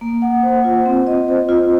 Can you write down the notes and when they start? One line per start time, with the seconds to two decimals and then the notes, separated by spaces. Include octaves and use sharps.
0.01 A#3
0.22 F#5
0.43 C5
0.64 F4
0.86 C4
1.07 D#5
1.28 C5
1.49 F4